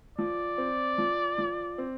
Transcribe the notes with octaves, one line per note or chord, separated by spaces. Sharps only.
F3 D5
C4
F3
F3
C4